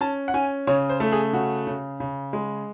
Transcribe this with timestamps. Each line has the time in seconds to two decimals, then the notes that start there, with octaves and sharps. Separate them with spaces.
0.01 C#4 A5
0.28 F#5
0.34 C#4 G#5
0.67 C#3 C#5
0.90 C5
1.00 A3
1.12 G#4
1.33 C#3 F#4
1.67 C#3
2.00 C#3
2.33 G#3